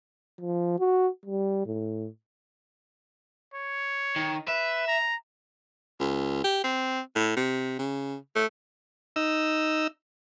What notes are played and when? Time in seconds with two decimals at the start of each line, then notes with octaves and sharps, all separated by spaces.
0.41 F3
0.80 F#4
1.26 G3
1.66 A2
3.54 C#5
4.16 D#3
4.48 B4 E5
4.88 A#5
6.00 C#2
6.44 G4
6.64 C4
7.16 A2
7.36 C3
7.79 C#3
8.35 A3
9.16 D#4 E6